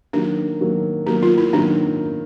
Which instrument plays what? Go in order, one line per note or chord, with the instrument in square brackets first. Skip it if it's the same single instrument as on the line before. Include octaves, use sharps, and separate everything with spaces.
[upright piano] D#3 F#3 A#3 [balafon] D4
[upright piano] D#3 F#3 A#3
[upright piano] D#3 F#3 A#3 [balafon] D#4
[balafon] F4
E4
[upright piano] D#3 F#3 A#3 [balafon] D4